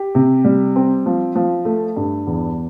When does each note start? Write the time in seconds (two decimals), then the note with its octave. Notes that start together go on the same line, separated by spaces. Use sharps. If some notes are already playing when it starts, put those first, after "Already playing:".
Already playing: G4
0.15 C3
0.45 G3
0.76 C4
1.06 F3
1.35 F3
1.65 A3
1.96 G2
2.27 E2